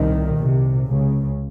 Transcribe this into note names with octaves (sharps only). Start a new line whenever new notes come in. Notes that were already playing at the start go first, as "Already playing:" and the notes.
Already playing: C2 A#2 D#3
C2 C3
C#2 C#3